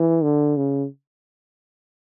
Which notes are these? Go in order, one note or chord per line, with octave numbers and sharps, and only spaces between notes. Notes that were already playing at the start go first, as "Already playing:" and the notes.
Already playing: E3
D3
C#3